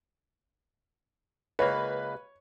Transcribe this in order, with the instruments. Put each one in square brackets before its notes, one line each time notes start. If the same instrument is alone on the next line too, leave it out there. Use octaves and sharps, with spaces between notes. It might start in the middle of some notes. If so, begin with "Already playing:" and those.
[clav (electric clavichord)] C#2 A#3 [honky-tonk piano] B4 [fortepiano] C#5